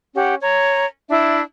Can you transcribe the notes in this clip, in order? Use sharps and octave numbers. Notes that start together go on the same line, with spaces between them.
C#4 G4 F#5
C#5 A#5
D4 E4 E5